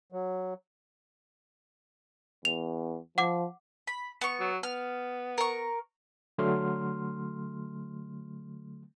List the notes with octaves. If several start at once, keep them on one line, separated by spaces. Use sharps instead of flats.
F#3
E2 F7
F3 F#5 D6
B5
B3 C#6
F#3
B3 F6
A#4 C#6
D3 F#3 A3 C6 F6